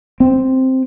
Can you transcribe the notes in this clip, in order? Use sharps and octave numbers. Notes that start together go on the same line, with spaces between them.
C4